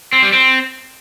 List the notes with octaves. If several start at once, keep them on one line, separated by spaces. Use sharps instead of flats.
C4
G3
C4